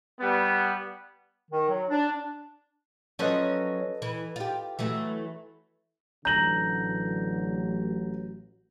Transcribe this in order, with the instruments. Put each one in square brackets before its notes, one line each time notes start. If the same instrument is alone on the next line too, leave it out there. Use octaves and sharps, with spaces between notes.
[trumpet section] G3 B3
[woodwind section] D#3
F#3
D4
[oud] F3 F#3 C#4 [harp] A4 B4 D#5
[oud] E3
F4 G4
E3 F#3 A3
[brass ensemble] A1 F#3 [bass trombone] D3 [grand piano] A#5 F#7 [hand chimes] G6 A#6